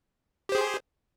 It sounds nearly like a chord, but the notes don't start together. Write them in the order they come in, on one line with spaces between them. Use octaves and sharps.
G4 C5 G#4